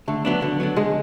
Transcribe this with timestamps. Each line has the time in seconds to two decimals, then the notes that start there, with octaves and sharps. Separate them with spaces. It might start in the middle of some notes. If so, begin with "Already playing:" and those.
0.08 D3 A3
0.25 F#3 B3 D4
0.42 D3
0.60 F#3 B3 D4
0.76 D3 G#3